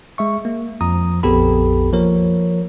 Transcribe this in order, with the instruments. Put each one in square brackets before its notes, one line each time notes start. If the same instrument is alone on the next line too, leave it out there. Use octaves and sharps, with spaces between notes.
[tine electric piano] G#3 E5 C#6
A#3
F2 F3 A#5 D#6
A#1 F2 B3 G4 A4 B5
F3 A#3 A#4 C#5